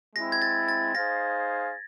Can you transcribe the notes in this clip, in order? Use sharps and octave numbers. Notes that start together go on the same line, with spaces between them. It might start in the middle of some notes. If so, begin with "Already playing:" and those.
G#3 C4 E4 A#6
G#6
A6
A6
D#4 G#4 C5 F5 A#6